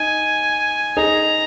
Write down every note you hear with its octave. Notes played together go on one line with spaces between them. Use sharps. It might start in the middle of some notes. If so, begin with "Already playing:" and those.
Already playing: D#4 G#5
D#4 G#4 A#5